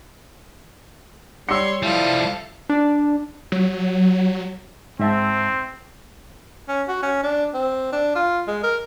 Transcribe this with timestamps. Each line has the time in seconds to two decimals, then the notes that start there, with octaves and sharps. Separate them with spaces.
1.49 G3 C#5 C6 E6 C#7
1.83 F3 G3 E4 A4 F5
2.69 D4
3.52 F#3
5.00 G#2 C4 E5 A5
6.68 C#4
6.88 F#4
7.03 C#4
7.23 D4
7.54 C4
7.92 D4
8.15 F4
8.47 G#3
8.63 A#4